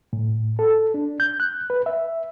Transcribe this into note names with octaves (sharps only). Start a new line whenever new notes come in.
A2
A4
D4
G6
F#6
B4
E5